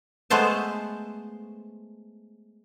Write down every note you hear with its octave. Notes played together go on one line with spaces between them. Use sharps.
G#3 A3 B3 C5 A5